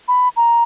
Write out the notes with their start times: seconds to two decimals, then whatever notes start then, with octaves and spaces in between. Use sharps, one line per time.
0.08 B5
0.37 A#5